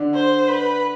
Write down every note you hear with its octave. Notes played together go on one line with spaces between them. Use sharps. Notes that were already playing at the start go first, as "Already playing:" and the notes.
Already playing: D3 D4
C5
B4